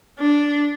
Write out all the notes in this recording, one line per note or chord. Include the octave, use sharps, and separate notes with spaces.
D4